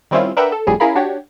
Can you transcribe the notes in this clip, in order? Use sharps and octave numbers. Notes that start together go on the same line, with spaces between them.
D#3 G3 C4 C#4 E4 F4
D4 A#4 B4 E5 F#5 G5
A4
G1 F2 A2 G3 G#4
C#4 E4 G#4 A#4 F5 B5
D4 F#4 G4 C#5